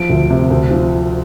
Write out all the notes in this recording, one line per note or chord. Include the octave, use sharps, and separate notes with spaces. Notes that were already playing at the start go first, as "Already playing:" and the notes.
Already playing: F3 D7
D2
C3
D2
F3